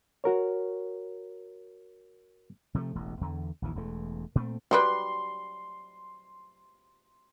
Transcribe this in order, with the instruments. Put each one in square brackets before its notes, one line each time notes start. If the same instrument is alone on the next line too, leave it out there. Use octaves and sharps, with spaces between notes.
[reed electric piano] F#4 A#4 C#5
[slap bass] C3 F3 G3 A3
E1 A1
E2 D3
A#1 D#2 E3
E1 E2 A3
A#2 A3 C4
[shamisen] F#3 G3 B4 [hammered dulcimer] C6